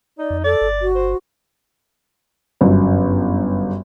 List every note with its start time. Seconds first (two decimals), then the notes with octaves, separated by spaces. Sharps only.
0.18 D#4 D5
0.30 F2
0.44 A4 D5
0.61 G1
0.82 F#4
0.95 C5
2.61 G1 F#2